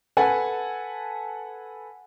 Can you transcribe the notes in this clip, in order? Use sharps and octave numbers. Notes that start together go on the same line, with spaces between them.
A4 B4 F#5 G#5 A5